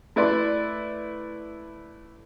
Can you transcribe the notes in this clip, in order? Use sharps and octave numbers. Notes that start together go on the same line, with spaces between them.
A3 E4 B4 D5 C6